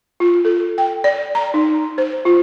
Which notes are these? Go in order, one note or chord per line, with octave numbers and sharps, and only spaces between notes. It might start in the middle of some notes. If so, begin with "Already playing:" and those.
F4
A4
G5
D5
A#5
D#4
C5
F4